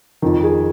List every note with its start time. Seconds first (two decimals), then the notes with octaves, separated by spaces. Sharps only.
0.22 F2 D#3
0.44 G#4